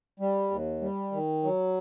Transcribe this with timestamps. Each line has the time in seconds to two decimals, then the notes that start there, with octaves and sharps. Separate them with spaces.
0.20 G3
0.51 D#2
0.81 G3
1.12 D#3
1.43 F#3